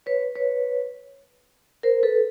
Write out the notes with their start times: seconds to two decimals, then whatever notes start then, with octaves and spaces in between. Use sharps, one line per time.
0.06 B4 C#5
0.35 B4 C#5
1.83 A#4 C5
2.03 A4 B4